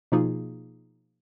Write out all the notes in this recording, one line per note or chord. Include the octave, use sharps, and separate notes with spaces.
B2 F3 A#3 D#4 F4 G#4